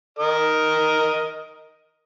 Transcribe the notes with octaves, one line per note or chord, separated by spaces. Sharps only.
A#4 D#5